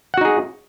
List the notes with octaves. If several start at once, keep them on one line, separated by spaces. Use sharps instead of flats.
D#4 F#4 G#4 F#5